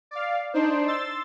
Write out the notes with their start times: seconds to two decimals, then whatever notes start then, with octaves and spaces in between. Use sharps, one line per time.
0.11 D5 F5
0.54 D4 D#4 C5
0.87 C6 E6 A6